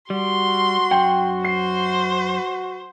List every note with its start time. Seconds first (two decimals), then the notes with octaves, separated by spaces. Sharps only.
0.10 G3 F#4 C6
0.91 F#2 F#5 G5
1.45 C5 C7